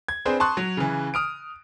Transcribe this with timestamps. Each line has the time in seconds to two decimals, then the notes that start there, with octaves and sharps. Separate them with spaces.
0.08 G#6
0.26 C4 D4 G#4 B4 C5
0.40 A5 C6 C#6 D#6 F#6
0.57 F#3
0.77 C#3 E3
1.14 D#6 F6 D7